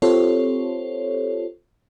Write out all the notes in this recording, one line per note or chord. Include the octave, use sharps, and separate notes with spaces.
C4 F4 G4 A4 C5 C#5